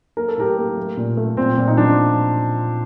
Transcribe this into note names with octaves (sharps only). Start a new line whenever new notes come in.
A#3 A#4
A4
A2 G4 A#4
A#3
A3
A#2
A3
A#2 C4
A#2
D#4
F3 D4